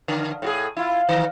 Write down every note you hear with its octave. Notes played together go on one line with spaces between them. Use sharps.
D3
A2 F#4 G#4
E4 F4
D#3